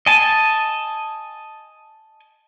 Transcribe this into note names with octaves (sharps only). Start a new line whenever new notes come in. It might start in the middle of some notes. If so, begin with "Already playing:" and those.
D#5 G#5 A5